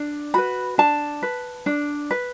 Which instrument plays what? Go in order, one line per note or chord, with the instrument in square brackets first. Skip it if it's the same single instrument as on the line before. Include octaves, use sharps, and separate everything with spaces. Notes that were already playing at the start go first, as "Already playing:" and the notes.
Already playing: [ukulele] D4
F#4 B4 B5
D4 A5
B4
D4
B4